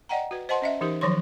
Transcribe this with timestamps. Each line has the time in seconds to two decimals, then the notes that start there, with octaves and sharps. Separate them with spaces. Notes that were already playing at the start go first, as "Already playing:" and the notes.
0.09 D5 D#5 F#5 G5 A#5
0.31 F#4 B4
0.49 C5 D#5 F#5 A5 C6
0.62 C#4 D#5 E5
0.81 E3 D#4 G4 A#4
1.01 D#3 F3 F#3 C#5 C6